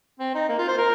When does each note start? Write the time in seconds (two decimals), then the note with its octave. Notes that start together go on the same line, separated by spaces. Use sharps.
0.20 C4
0.35 D#4
0.49 A#3
0.59 F4
0.68 C5
0.78 A#4